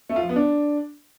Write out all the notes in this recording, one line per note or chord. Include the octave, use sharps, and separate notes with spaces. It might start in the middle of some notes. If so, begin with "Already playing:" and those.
A3
F4
F3
B3
D4